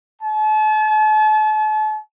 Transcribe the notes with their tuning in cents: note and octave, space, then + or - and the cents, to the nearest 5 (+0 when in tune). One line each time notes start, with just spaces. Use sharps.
A5 -40